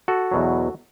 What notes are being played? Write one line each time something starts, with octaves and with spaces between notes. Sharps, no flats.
F#4 A4
E2 B2 F#3